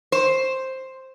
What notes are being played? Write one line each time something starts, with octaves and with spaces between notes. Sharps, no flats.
C5